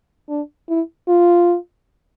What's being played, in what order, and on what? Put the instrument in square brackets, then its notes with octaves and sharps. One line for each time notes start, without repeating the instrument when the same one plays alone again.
[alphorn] D4
E4
F4